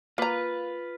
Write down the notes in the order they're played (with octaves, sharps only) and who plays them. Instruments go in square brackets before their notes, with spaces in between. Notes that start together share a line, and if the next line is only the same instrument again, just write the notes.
[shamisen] A#3 A#5 [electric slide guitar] F4 B4